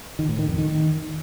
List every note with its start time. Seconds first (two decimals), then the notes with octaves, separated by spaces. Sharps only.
0.19 D#3
0.29 A2
0.38 D#3
0.48 F2
0.58 D#3